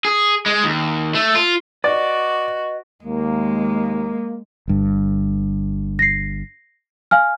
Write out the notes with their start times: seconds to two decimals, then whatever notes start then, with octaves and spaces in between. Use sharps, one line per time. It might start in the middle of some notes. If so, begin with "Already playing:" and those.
0.05 G#4
0.46 G#3
0.64 D#2
1.15 A3
1.35 F4
1.84 F#4 B4 D5 D#5
3.03 D#2 G#3 A#3
4.68 G1 G2
5.99 A#6 C7
7.11 F5 G#5 F6